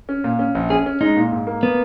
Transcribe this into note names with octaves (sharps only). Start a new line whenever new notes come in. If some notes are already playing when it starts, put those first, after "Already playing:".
C#4
A#2
C#4
A#1
C#4 G#4
C#4
G#3 D#4
A#2
G#2
A#3
A#3 B3